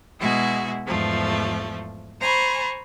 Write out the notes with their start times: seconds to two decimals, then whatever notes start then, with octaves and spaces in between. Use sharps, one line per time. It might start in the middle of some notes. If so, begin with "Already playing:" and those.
0.20 B2 G#3 E4 F#4 G#4
0.86 E2 G#2 F3 A3
2.20 C5 G#5 A#5 B5 C#6